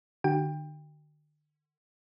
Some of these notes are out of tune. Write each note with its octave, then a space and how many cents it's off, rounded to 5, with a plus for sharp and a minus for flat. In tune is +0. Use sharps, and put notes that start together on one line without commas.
D3 +40 F#4 +40 G5 +25